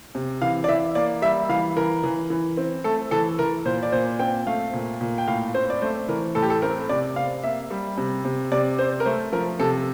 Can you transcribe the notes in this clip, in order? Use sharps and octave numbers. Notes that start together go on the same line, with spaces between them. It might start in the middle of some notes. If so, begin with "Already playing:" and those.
C3
E3 F5
D5
E3 E5
A#3 D5
G3 E5
E3 F5
E3 A#4
E3
E3
C4
A3 A4
E3 A4
E3 A#4
A#2 C5
D5
A#2 C5
C4 G5
A3 F5
A#2
A#2
G5
A2 F5
C4 C5
D5
A3 C5
E3 A#4
A2 A4
G4
A4
C4 A#4
C3 D5
C3 F5
A#3 E5
G3
C3
C3
C3 D5
C4 C5
A#4
A3 C5
F3 A#4
C3 A4